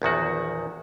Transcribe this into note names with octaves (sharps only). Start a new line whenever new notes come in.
A#1 E2 D#3 F#4